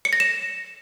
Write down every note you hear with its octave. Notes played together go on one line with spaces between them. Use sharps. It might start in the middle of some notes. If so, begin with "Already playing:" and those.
C#7
A#6
E7